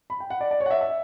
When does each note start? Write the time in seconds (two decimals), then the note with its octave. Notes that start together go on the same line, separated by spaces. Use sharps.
0.10 B5
0.20 G5
0.30 F#5
0.41 D5
0.51 D5
0.60 C#5
0.66 F#5
0.71 E5
0.81 E5